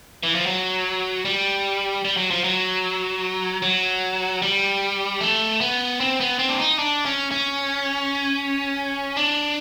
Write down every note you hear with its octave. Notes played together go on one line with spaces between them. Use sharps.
E3
F3
F#3
G3
G3
F#3
F3
F#3
F#3
G3
A3
B3
C4
B3
C4
D4
D#4
D4
C#4
C#4
D4